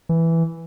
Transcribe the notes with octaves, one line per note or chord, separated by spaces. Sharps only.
E3